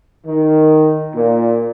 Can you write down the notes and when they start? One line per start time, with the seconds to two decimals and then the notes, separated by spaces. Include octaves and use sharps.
0.24 D#3
1.14 A#2